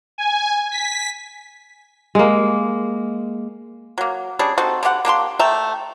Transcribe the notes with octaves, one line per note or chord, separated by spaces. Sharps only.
G#5
B6
G#3 A#3
F#3 A#3
G3 C#4 D4 G#4
C4 D#4 F#4 A4
D3 G4 C#5 F#5
A#3 D4 G4 C6
A3 E5 G5 A#5